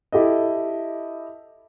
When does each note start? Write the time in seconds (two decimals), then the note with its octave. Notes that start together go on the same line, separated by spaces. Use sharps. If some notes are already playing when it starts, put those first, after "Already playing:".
0.12 E4 G4 A4 D#5